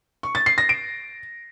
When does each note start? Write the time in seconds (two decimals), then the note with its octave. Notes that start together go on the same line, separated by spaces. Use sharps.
0.23 C#6
0.35 A6
0.46 C7
0.58 A#6
0.69 D7